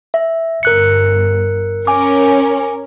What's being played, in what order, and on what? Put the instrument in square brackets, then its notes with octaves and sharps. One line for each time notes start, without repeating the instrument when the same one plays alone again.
[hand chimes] E5
[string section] G1 [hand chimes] A#4 F#6 C#7
[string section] C#4 A#4 [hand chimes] G#5 D6